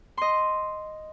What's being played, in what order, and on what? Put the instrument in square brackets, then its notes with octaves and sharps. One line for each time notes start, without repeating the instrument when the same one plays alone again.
[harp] D#5 C6